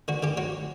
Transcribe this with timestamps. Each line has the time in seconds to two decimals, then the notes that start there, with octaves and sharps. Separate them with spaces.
0.08 D3 F#4
0.23 D3 G4
0.37 F#3 F#4